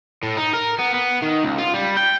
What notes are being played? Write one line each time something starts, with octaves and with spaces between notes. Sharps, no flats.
A2
D#4
A#4
B3
B3
D#3
C#2
F4
G3
G5